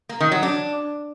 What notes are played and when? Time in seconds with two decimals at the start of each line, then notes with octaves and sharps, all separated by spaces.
0.09 A#3
0.20 D#3
0.32 F#3
0.43 D4